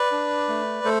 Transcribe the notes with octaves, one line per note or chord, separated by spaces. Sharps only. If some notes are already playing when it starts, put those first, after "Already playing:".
Already playing: B4 D5
D4
A3
A3 A4 C5